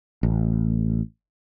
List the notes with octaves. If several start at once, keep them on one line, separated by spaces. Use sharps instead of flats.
A1